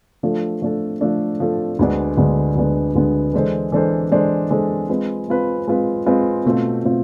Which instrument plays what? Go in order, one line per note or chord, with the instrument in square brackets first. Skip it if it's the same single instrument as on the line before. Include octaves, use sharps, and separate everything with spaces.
[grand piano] F3 A3 D4 A4
F3 A3 D4 A4
F3 A3 D4 A4
F3 A3 D4 A4
D2 D3 G#3 B3 D4
D2 D3 G#3 B3 D4
D2 D3 G#3 B3 D4
D2 D3 G#3 B3 D4
E3 G#3 D4 A4 C5
E3 G#3 D4 A4 C5
E3 G#3 D4 A4 C5
E3 G#3 D4 A4 C5
G#3 C4 F4 B4
G#3 C4 F4 B4
G#3 C4 F4 B4
G#3 C4 F4 B4
B2 A3 C4 F4
B2 A3 C4 F4